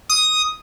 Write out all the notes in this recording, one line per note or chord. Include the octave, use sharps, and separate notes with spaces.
D#6